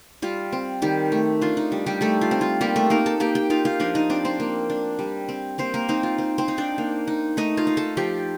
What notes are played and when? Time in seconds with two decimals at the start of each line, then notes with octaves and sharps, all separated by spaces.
0.22 G3 F4
0.52 C4
0.82 D#3 G3 G4
1.12 A3
1.41 D4 F4
1.57 D#4
1.72 G3
1.86 G3 G4
2.01 G3 A3 A4
2.21 F4
2.31 C4
2.41 F4
2.61 G3 A#3 G4
2.76 A3 A4
2.90 A#3 D#4 A#4
3.06 A4 A5
3.20 A#3 G4 G5
3.35 G4 G5
3.50 D#4 F4 F5
3.65 F4 F5
3.80 F3 D4 D5
3.95 D#4 D#5
4.10 C4 D4 D5
4.25 C4 C5
4.40 A#3
4.70 D4
4.99 G3
5.29 C4
5.58 A#3 C4 C5
5.74 A#3 A#4
5.88 C4 D#4 C5
6.03 F4
6.18 C4
6.38 C4 C5
6.48 D#4
6.58 D4 D5
6.78 A#3
7.08 D#4
7.37 A3 D#4 D#5
7.57 F4 F5
7.67 D#4
7.77 A4 A5
7.97 F3 G4 G5